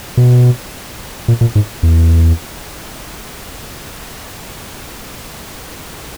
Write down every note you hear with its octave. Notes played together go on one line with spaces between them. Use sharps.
B2
A#2
A#2
G#2
E2